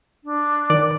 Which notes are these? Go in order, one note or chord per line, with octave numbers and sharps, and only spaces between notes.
D4
D#3 D5